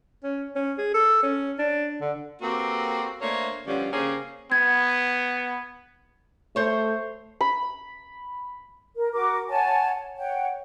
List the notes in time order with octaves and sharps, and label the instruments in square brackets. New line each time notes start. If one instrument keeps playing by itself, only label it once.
[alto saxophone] C#4
C#4
G#4
A4
C#4
D4
D3
[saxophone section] A#3 C4 F#4 G4 A4 B4
A3 A#3 D4 C5 C#5
D3 F3 G3 B3 C#4
C#3 A#3 C#4 G4 G#4 C5
[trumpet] B3 [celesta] G#6
[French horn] A3 [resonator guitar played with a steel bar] C5 C#5
[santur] B5
[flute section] A#4
F#4 A#4 D6
C#5 F#5 G#5 A5
C#5 F#5 G5